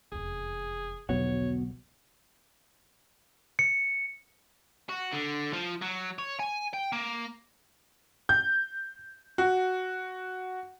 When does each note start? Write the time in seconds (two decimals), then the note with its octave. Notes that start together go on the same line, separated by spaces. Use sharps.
0.12 F1 E2 G#4
1.09 B1 E2 D3 B3 F#4 C#5 F#5
3.59 C#7
4.89 F#4
5.13 D3
5.53 F3
5.81 F#3
6.18 C#5
6.40 G#5
6.74 G5
6.93 A#3
8.29 G6
9.38 F#4